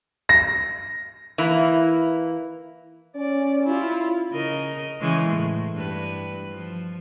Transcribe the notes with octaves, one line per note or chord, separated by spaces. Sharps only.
A#6
E3 A#3 E4
C#4 D5
E4 F4
C#3 A#4 D#5
C#3 E3 G#3
A2
G2 B4
F3